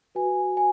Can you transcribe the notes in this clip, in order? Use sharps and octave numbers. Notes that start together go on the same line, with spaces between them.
F#4 B4 G#5
G#5